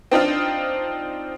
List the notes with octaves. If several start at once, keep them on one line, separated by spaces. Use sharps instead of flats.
C4 D4 D#4 F4